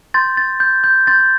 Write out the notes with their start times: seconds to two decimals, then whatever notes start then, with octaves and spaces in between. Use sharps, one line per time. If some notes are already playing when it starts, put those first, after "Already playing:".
0.14 C6 G6 A6
0.37 A6
0.60 G6
0.84 G6
1.07 C6 G6 A6